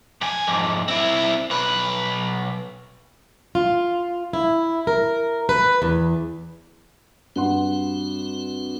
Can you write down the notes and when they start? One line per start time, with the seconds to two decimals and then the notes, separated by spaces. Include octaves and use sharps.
0.21 F2 G#5
0.47 F2 G#2
0.88 C4 E4
1.50 B1 B4
3.55 F4
4.33 E4
4.87 A#4
5.49 B4
5.82 E2
7.36 G2 C4 F#4 F#5 C6